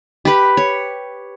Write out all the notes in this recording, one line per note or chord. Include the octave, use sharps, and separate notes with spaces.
G4 B4
C#5